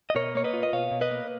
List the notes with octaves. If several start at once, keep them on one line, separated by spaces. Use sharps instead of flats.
D#5
B2 A#4 C#5
A#3 C#5
B4 D#5
F4
D#5
B2 C#5 F5
B2
B4 D#5
A#3